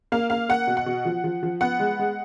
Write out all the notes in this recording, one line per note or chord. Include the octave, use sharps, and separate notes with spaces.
A#3 F5
A#3 F5
A#3 F#5
B2
F#5
B2
F3
F3
F3
B3 F#5
G#3
G#3